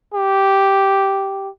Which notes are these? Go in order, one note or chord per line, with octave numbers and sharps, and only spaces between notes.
G4